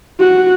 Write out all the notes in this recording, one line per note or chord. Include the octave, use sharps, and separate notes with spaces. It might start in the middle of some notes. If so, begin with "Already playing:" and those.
F#4